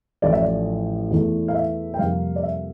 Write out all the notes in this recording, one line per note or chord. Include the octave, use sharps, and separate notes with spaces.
A1 A2 F3 A3 D5
E5
D5
E2 E3 A3
F5
E5
G5
F2 C3 G3 A#3 F5
D5
E5